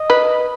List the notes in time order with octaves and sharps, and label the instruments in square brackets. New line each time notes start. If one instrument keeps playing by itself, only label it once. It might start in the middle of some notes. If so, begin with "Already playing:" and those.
Already playing: [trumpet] D#5
[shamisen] B4